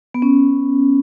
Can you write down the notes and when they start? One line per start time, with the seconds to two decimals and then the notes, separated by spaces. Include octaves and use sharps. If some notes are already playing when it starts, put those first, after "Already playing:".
0.14 B3
0.22 C#4